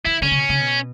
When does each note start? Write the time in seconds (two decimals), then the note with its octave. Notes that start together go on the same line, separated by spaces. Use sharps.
0.05 E3 E4
0.22 D3 C#4
0.31 C#3
0.38 B2
0.49 C#3
0.59 B2